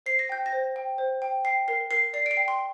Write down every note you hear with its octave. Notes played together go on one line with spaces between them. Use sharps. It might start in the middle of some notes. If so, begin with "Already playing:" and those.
C5 C7
A#6
G5 G6
A#6
C5
G5
C5
G5
G5 C7
A#4 C7
A#4 C7
D5 C7
D7
C7
G5
C6